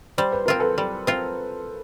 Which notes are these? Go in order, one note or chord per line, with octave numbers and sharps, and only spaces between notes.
G3 C5
B4
C4 F4 A#4
A4 B4
G3
C4 F4